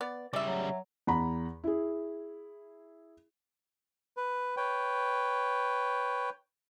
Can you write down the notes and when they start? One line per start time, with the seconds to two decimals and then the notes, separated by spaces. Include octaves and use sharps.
0.01 B3 D5
0.33 C#3 G3 D5 E5
0.47 F#3
1.07 E2 F#5 A#5 B5
1.64 E4 G#4
4.17 B4
4.57 B4 C#5 G5